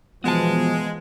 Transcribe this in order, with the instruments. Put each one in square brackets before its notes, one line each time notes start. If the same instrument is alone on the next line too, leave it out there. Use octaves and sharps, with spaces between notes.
[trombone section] B2 F3 [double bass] E3 [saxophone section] G#3 [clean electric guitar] B3 A5